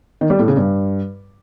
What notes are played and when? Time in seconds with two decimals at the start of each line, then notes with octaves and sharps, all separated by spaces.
0.21 D#3
0.30 G3
0.39 A2
0.48 C#3
0.57 G2